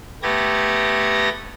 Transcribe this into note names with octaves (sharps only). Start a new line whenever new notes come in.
A3 B3 G4 G#6 A#6